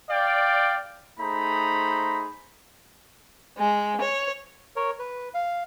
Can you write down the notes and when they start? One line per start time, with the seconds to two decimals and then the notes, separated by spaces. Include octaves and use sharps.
0.10 D5 F5 G5
1.20 A3 D#4 G#4 C5 A#5 B5
3.58 G#3
4.01 C#5
4.76 A#4 C#5
4.99 B4
5.34 F5